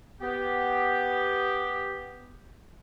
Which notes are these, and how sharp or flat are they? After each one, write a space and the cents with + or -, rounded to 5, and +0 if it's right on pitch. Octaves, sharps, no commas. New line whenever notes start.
B3 +0 G4 +0